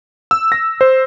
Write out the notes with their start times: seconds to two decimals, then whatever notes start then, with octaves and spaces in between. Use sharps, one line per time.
0.31 E6
0.52 A#6
0.81 C5